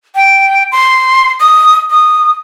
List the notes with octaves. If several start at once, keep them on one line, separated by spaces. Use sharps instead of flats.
G5
C6
D#6
D#6